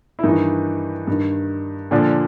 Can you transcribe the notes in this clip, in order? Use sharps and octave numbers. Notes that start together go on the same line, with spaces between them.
E4
G2 D#3 E3 D#4
G2 D#3
A#2 D3 F3 D4